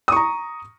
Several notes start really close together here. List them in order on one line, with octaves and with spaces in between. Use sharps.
D#6 C#6 A#5